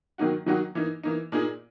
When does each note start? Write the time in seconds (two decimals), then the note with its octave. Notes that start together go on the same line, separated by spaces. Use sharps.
0.18 D#3 F#3 A#3 D#4 F#4
0.46 D#3 F#3 A#3 D#4 F#4
0.75 E3 A#3 D#4
1.03 E3 A#3 D#4
1.32 A#2 A#3 D#4 G#4